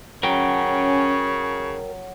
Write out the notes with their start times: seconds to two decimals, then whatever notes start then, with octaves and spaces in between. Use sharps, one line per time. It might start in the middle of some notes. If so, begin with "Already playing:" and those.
0.23 C#3 F#3 C#4 A#4 G5